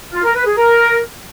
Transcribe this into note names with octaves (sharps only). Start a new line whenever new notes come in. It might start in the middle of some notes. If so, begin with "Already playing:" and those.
F4
A#4
B4
G#4
A#4